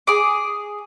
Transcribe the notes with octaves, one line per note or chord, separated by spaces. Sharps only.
G#4 D6